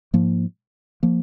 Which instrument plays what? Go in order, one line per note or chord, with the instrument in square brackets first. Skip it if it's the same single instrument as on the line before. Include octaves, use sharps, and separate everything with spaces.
[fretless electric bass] G#2 F3 A#3
F3 A#3